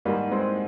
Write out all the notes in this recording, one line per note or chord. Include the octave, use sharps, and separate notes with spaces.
G#2 D#3 G3 A#3
G#3 C4